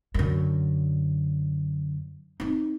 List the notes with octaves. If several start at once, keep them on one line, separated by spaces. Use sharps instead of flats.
F#2 D3
C4 D#4